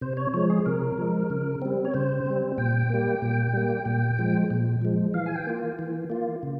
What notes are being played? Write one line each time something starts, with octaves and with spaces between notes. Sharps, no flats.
C3 C5
C#5
F3 G#3 C#5
G#4
C3 A#4
F3 G#3
C#3
G3 C4
C#5
C#3 C5
G3 C4
A#2 G5
G3 A#3
A#2
G3 A#3
A#2
F3 G#3
A#2
F3 G#3
E3 F5
G#5
G5
A#3 F4
E3
A#3 F4
C#3